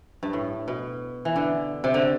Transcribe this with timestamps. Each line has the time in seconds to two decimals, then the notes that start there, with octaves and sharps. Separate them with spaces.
0.23 G2
0.33 A2
0.68 B2
1.25 E3
1.36 D3
1.84 C3
1.94 D3